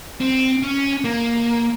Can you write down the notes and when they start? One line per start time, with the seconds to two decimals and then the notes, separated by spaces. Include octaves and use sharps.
0.21 C4
0.62 C#4
1.04 A#3